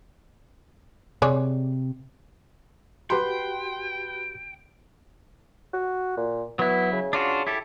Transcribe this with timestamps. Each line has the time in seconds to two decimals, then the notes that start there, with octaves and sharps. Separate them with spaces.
1.22 C3 G#3 C#5 D5
3.10 F#4 G4 B4 G5 B5 C6
5.73 F#4
6.17 A#2
6.59 F#3 B3 E4
6.93 C#3
7.13 D4 F4 F#4
7.47 E4 G4 A4